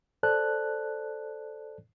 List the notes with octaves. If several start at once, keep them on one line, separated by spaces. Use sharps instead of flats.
A4 C5 D5 A5 F#6